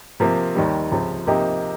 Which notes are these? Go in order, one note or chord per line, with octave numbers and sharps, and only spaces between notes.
C3 F3 A#3
D#2 D#3 G3
C#2 C3 F3
C3 F3 A#3 D#4 G4